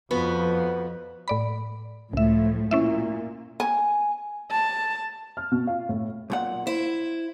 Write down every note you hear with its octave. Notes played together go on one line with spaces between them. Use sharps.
F2 F3 B3 F#4 B4
A2 D5 B5
C#2 A2 F3 A3 E5
A#2 C#4 E4 E5
G#5
A5
F6
B2
F4
A2
B1 A#2 F#5
E4 C5